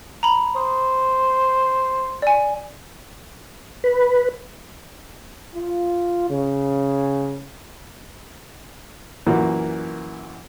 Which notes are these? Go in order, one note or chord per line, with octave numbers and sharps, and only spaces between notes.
A#5 B5
C5 D#6
D5 G#5
B4
F4
C#3
F#2 A#2 E3 A#3 E4 F#4